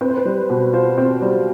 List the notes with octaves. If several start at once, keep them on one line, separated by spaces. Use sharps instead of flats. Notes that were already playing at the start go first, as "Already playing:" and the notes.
C4 B4
C5
B4
G3
B2
F4 C5
C4
G3